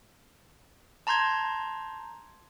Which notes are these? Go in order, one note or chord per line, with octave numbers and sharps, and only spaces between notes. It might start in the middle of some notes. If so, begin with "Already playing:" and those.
A5 A#5 C6 G6 G#6